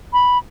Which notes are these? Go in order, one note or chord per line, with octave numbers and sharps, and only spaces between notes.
B5